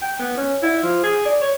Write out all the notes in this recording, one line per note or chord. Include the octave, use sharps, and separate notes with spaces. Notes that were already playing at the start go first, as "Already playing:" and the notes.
G5
B3
C#4
E4
F3
G#4
D5
C#5